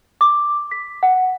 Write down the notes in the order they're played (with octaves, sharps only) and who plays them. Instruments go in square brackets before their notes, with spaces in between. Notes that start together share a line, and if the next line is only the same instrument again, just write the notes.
[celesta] D6
B6
F#5